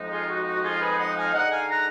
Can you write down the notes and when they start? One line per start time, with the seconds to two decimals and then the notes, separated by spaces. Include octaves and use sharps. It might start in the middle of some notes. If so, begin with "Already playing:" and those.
Already playing: F2 F3 G#3 D#4
0.10 F4 G#4
0.28 F#4
0.46 F#4
0.63 F4 G#4
0.80 G#4 B4
0.98 D#5 F#5
1.16 F5 G#5
1.33 D3 G#3 D#4 D#5 F#5
1.51 F5 G#5
1.68 F#5 A#5